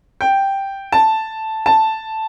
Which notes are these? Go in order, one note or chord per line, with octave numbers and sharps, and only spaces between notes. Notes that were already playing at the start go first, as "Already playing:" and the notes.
G5
A5
A5